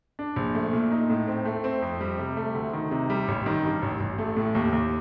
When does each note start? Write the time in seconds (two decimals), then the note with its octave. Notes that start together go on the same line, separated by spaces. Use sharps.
0.19 D4
0.36 A#1
0.55 A3
0.73 A#2
0.92 D#4
1.10 A2
1.27 C4
1.45 A3
1.64 C4
1.82 F2
2.01 G3
2.18 C3
2.37 A3
2.55 D2
2.73 D#3
2.91 C3
3.10 G3
3.28 A1
3.46 D#3
3.64 G2
3.82 A1
4.00 A1
4.18 A3
4.36 A2
4.55 D#2
4.73 D#2